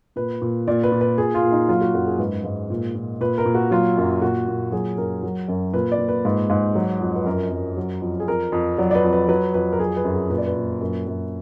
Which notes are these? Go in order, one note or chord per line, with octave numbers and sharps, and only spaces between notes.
A#2 B4
A#2
A#2 D5
B4
A#2
B4
A#2 G#4
F4
A#2
D#4
F#3 F4
F#4
F#2 F#4
G#4
G#2 B4
G#2
A#2
A#2
A#2 B4
A#4
A#2
F#4
F#3 F4
F#2
A#2 F#4
A#2
F#3 G#4
F#2 A#4
F#3
F#2
A#2 B4
D5
A#2
B4
G#2
G#2
F#3
F2
B4
F#2 A#4
F#2
F#3
F2
G#4
F2 A#4
F2
F#3 D5
D5
B4
F2
B4
F#3 B4
F2 B4
A#4
F#3 G#4
B4
F#2
G#4
A#2 B4
D5
B4
A#2
F#2
F#2